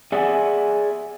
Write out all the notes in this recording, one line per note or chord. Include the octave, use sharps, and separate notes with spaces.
G#4 D5 E5 F#5 G#5